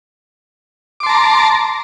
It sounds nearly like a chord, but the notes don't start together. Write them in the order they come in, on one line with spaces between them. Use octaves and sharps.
D6 C6 A5 A#5